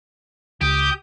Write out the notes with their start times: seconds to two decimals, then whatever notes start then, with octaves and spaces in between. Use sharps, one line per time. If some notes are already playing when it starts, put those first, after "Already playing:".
0.61 C#2 G4 D#6 G6